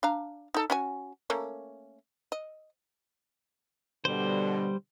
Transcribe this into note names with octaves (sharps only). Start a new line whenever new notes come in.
D4 F5 A#5
D#4 A4
C#4 F#4 G#5
A3 A#3 C#4
D#5
B2 D3 G3 C5